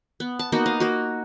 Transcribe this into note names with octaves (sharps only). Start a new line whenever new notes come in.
B3
A5
A#3 B3 D#4 F#4
D#5 F5
A#3 F#4